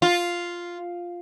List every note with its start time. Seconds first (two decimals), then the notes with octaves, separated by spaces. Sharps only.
0.02 F4